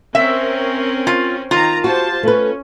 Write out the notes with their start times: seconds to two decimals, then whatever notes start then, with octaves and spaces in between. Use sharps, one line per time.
0.15 C4 C#4 A#4 E5
1.07 F4
1.51 D#3 F4 A#5
1.84 F#4 G4 C5 A5
2.23 A3 C#4 B4